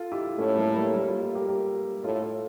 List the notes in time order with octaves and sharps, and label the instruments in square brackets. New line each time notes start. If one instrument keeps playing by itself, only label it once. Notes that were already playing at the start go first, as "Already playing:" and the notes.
Already playing: [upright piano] F4 A4
E4 G4
[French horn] A2 [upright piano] A3 C#4
[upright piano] G3 A#3
G3 A#3
G3 A#3
F4 A4
F4 A4
G4 A#4
G4 A#4
[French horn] A2 [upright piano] F4 A4
[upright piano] F4 A4